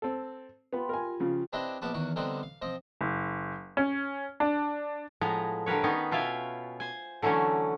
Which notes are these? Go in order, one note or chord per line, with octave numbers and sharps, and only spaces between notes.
C4 A4
B3 F4 G4 B5
A#4 G#5
C#3 F3
C4 D4 E4 G4 B4 D#5
A#1 B3 F#4 B4 A5 D6
E2 D#3 F#4 C#6
D3 G3 B3 C4 D#4 F#4
F5
F3 C4 D#5
F#1
C#4
D4
A2 F3 G#3 B3 A#5
D3 G3 A#4 B4 C#5
D#3 B3 C#4 D#4
B2 F4 E5 F5 G5 G#5
C5 G#5
D3 E3 F#3 A3 C#4